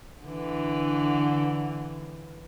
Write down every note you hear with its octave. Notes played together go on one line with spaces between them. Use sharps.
D3 E3